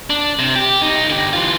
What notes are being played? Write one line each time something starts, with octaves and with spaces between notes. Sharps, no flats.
D4
C3
G4
B1 D#4
D3 G4
E3 F4